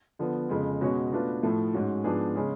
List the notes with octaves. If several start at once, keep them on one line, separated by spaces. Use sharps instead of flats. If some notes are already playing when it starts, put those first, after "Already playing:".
D3 F3 B3
F2 C#3 G#3
B2 G#3 C#4 F#4 C#5
B2 A3 D4 F4 B4
A2 F3 A3
G#2 G#3 C#4 F#4
G#2 F3 B3 D4 G#4
C#3 G#3 C#4 G#4